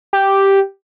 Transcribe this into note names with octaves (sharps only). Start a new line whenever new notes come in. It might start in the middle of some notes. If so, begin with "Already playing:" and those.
G4